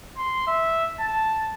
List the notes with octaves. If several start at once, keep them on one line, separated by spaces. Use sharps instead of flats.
C6
E5
A5